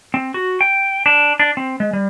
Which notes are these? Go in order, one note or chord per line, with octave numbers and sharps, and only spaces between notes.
C4
F#4
G5
D4
D4
C4
G#3
G3